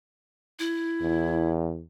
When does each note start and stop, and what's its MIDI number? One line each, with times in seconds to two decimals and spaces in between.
0.59 1.51 64
1.01 1.83 40